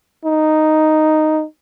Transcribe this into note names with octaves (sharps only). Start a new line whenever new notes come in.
D#4